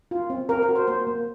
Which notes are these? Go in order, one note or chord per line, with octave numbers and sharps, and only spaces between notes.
F4
C4
C4 A#4
A#4
F#4
C5
A#3 C5
A#3